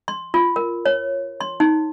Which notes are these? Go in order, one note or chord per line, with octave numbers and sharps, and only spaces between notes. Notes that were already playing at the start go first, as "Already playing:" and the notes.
C6
F4
A#4
C#5
C6
D#4